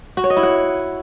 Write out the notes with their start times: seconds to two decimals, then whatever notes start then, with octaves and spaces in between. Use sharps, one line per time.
0.17 F#4
0.24 C#5
0.30 D#5
0.37 E4
0.43 F#5